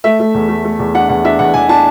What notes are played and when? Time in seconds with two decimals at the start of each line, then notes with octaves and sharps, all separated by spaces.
0.04 A3 E5
0.20 A3
0.34 E2
0.49 A3
0.65 A3
0.79 E2
0.94 D4 F#5
1.09 E2 F#5
1.24 D4 E5
1.39 E2 F#5
1.54 E2 G#5
1.69 D4 A5